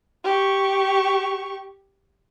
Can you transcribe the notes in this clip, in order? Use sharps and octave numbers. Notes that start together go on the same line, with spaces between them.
G4 C#6